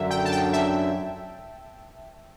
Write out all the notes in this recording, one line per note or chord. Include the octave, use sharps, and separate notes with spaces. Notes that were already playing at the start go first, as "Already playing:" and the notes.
Already playing: F#2 D3 F#3 E5
G5
A5
G5
E5